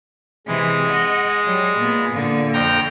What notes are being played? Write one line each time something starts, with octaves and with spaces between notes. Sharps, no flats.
C3 E3 G#3
D#5 F#5
F#3 G3
A#2 B3
A#2 D3
F2 G5 A#5